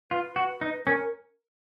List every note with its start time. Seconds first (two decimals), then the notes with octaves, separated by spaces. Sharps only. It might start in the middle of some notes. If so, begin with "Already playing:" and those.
0.11 F4 B4
0.36 F#4
0.61 D#4
0.86 C#4 A#4